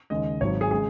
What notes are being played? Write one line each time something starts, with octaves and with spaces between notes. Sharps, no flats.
D#2 C#3 G#3 D#5
G#1 G#2 F#3 C#5
G#4
C#3 G#3 G#4